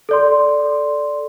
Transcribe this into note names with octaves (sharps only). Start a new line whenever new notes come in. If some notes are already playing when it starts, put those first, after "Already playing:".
A4 D5 C6